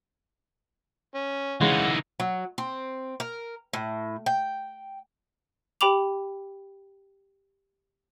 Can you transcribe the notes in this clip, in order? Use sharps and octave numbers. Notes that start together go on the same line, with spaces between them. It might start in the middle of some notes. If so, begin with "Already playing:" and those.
C#4
C#3 E3 G#3 D#4 F#5
F#3
C4
A#4
A2
G5
G4 G5 B5 D6 F7